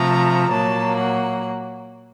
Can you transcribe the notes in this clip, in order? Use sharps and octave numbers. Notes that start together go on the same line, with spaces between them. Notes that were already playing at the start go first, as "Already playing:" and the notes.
Already playing: C3 F3 A3 A#5
A#2 F#3 A#3 A5
F#5